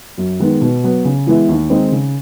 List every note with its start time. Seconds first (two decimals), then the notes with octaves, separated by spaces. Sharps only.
0.18 F#2
0.40 D#3 G#3 B3
0.62 B2
0.84 F#3 B3
1.05 C#3
1.27 E3 G#3 B3 E4
1.48 D#2
1.70 D#3 G#3 C4 D#4
1.92 C#3